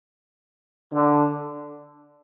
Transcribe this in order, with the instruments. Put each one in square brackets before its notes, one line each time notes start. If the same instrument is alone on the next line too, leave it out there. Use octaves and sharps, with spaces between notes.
[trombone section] D3